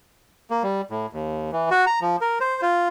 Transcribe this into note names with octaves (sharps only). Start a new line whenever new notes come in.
A#3
G3
A2
D#2
E3
F#4
A#5
F3
A#4
C5
F4